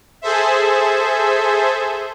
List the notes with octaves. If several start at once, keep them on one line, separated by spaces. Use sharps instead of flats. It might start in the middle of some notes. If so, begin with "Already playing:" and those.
G#4 A4 C5 E5